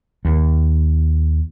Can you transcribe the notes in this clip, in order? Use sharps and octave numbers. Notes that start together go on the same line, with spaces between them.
D#2